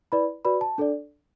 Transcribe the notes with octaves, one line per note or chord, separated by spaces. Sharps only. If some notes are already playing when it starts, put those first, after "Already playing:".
E4 B4 D5 B5
F#4 B4 D5 B5
A5
D4 A4 D5